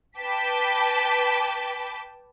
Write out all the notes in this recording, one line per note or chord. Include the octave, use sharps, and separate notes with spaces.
B4 G5 A5 D6 B6